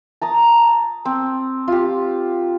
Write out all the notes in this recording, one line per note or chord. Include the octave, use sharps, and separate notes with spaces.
A5 A#5 D#6
C4
F4 G4